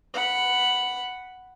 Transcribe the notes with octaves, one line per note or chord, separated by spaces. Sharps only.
F#5 B5